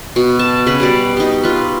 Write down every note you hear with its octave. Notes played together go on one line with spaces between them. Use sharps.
B2
A5
C#3 B4 B5
B2 G3 D5
D#4 G4
F4 B4